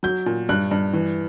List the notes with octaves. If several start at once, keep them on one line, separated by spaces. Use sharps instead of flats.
F#3 G6
A#2
G2 F#6
G2
E3